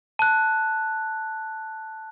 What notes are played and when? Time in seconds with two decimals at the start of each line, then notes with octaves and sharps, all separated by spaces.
0.19 A5 F#6